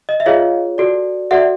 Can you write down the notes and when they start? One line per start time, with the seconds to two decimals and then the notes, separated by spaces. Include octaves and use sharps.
0.09 D#5
0.20 E5
0.26 F4 G#4 C#5 D#5 F5
0.78 F#4 A4 D5
1.31 F#4 A4 D5 E5 F#5